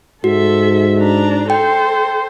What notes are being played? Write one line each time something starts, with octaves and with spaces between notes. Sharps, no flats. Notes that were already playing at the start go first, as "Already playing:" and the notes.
G#2 F#4 A4 E5
D4 A#5
A4 C5 G5